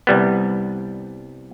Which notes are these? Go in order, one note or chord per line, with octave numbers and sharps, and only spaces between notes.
C2 G3 B3